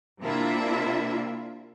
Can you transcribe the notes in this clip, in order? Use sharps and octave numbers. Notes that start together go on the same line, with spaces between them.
C3 A#3 D4 E4 F4 E5